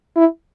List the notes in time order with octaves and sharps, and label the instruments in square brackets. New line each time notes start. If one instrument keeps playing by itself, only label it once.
[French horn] E4